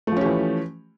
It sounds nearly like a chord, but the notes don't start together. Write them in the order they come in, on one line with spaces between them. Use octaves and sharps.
A3 F3 C#4 G4 E3